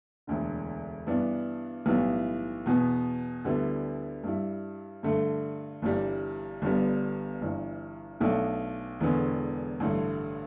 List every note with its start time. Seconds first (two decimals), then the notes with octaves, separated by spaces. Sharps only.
0.27 E1 D2 D3
1.07 G2 E3 B3 D4
1.86 B1 A2 E3 G3 B3
2.66 E2 B2 B3
3.44 D2 D3 G3 B3 E4
4.24 G2 G3 E4
5.03 G2 D3 A3
5.82 G1 G2 E3 G3
6.62 G1 G2 D3 G3 B3
7.41 G1 G2 E3
8.20 B1 B2 A3 D4
9.00 E1 E2 D3 B3
9.80 A1 G2 D3 A3